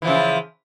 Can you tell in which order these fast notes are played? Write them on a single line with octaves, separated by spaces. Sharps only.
E3 F3 C#3